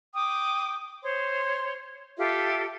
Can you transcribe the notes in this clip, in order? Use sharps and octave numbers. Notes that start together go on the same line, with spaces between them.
G5 D6 D#6
C5 C#5 C6
F4 G4 A4 E5